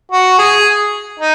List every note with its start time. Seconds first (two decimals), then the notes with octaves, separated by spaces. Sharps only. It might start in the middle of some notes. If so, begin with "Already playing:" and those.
0.12 F#4
0.39 G#4
1.20 D#4